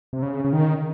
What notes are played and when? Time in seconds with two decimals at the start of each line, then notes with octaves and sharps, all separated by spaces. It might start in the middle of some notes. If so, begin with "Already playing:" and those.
0.13 C3
0.23 C#3
0.44 C#3
0.53 D#3